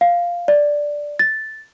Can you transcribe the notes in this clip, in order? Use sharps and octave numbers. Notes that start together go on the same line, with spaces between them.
F5
D5
A6